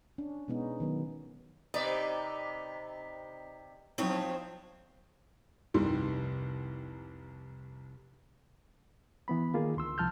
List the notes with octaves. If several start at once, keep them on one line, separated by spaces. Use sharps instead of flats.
C#4 D4
B2 G#3 B3 C#4 D#4
D#3 F#3 B3
C3 D#4 B4 D5 D#5
A#2 F3 F#3 C4 D#4 E4 C#5
F1 C2 D#3 G3 C6
E3 B3 B5
D#3 A#3 F4 G#4
D2 C6 E6
C2 F3 A5 F6 G6